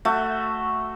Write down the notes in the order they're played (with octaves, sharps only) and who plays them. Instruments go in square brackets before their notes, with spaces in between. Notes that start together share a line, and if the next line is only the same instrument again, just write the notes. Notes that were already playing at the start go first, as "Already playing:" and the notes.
[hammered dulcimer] A3 F#4 E5